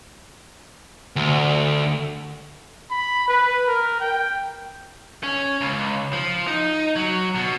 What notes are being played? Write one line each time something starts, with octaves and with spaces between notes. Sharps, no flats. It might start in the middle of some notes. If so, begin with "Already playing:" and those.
D2
B5
B4
A#4
G5
C#4
C#2
F3
D#4
F#3
B2